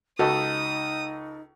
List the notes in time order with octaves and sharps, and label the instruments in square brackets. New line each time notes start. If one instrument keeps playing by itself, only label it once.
[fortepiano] C#2 A4 [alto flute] D#4 [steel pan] F#4 D#5 [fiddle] D#6